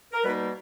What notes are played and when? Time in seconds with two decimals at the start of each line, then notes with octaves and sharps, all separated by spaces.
0.13 A#4
0.22 B2 G3 A#3 D#4 B4